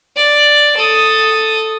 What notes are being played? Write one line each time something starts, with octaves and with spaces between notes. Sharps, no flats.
D5
A4 D#6